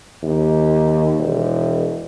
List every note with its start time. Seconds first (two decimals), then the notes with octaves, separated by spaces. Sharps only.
0.23 D#2
1.18 E1